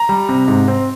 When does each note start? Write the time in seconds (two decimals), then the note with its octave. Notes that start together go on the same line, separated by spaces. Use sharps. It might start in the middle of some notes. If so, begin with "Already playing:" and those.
Already playing: A#5
0.09 G3
0.29 C3
0.48 G#2
0.68 C4